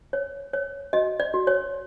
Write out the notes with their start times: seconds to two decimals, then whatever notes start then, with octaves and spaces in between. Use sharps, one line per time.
0.13 C#5
0.53 C#5
0.93 F#4 D#5
1.20 D5
1.34 F#4
1.47 C#5